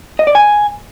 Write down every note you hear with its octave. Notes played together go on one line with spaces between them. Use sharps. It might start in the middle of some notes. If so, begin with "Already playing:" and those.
D#5
D5
G#5